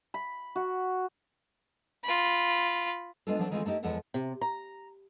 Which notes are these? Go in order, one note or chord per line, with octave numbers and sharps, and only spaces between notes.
B5
F#4
F4 B5
G#3 B3 D4 F4 A4
F3 F#3 B3 C4 D4
D#3 E3 G#3 A3 C4 F4
A3 A#3 D#4 G4
E2 F3 G#3 A4 F#5
C3
A#5